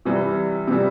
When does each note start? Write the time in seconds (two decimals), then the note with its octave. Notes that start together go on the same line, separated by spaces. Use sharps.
0.05 C3 E3 G3
0.67 C3 E3 G3